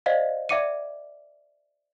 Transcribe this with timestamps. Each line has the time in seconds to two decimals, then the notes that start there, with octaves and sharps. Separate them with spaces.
0.06 C5 D5 D#5 F5 F#5
0.49 D5 E5 F#5 D6 C#7 D#7